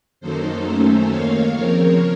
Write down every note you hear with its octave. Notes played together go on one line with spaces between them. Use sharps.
F#2 D#3 F#3 A#3 D#4 A4 C5
F#2 D#3 F#3 A3 C#4
D#2 D#3 A#3 C#5 F5
C#3 F3 C4 A#4 C#5